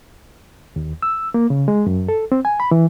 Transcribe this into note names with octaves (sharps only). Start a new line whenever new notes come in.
D#2
E6
A#3
C#3
G#3
F#2
A4
C4
G#5
B5
E3